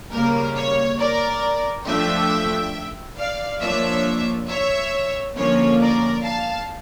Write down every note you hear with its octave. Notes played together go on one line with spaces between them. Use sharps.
C#3 G3 A#3 A#4
C#5
A#4 D5
F3 A3 D4 E5 G5
D5 F5
F3 A#3 D4 C#5 E5
C#5 E5
D3 F3 A#3 C#4 C#5
A#4 D5
F5 A5